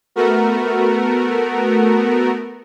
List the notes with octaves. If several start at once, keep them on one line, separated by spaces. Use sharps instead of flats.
A3 B3 F#4 A#4